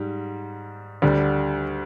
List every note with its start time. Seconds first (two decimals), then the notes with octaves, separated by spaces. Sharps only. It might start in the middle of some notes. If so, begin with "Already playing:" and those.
Already playing: G#2 G3
1.02 D2 D3 G3